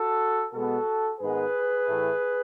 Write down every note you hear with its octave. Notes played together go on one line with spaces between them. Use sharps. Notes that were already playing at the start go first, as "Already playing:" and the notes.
Already playing: F#4 A4
B2 G#3 B3 F#4 A4
G#2 D#3 G#3 B3 G#4 B4
A2 E3 A3